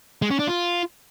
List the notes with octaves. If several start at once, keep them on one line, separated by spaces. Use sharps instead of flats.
G#3
C#4
D4
F4